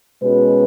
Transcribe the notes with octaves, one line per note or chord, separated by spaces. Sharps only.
B2 G#3 C#4 F#4 B4